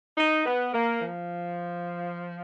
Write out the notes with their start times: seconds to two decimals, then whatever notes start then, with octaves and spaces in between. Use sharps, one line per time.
0.18 D#4
0.46 B3
0.74 A#3
1.02 F3